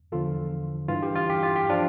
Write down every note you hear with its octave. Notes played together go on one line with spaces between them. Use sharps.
E2 D3 F3 F4 A4
G2 E3 F4
G4
F4
G4
F4
G4
F3 D4 F4